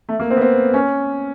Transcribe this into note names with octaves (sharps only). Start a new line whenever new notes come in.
A3
A#3
C4
B3
C4
C#4